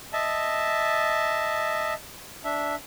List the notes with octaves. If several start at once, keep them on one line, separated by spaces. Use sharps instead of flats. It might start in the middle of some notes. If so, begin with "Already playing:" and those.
D#5 E5 A5
D4 E5